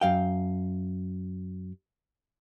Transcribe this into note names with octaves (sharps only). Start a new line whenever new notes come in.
F#2 F5 G5